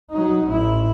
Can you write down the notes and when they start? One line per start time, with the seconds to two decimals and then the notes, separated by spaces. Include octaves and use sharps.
0.11 F#3 D#4
0.48 A1 E4